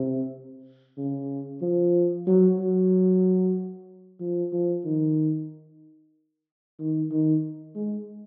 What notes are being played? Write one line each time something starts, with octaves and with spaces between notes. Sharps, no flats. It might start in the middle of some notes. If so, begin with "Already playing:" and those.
Already playing: C3
C#3
F3
F#3
F#3
F3
F3
D#3
D#3
D#3
G#3